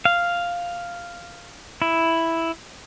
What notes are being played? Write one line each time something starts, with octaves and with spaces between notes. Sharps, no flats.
F5
E4